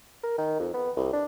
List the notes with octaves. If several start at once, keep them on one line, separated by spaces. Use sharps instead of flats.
A#4
D#3
F2
B3
C2
D4